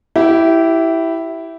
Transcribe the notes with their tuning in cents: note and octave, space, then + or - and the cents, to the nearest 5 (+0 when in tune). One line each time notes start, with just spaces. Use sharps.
E4 +0 G4 -20